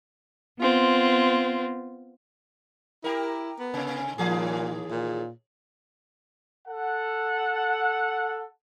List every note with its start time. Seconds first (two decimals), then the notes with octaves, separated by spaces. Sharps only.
0.60 B3 C4 F4
3.04 E4 G4 A#4
3.59 B3
3.74 C3
4.18 D#2 A#2 E3 G#4
4.91 A#2
6.68 A4 F#5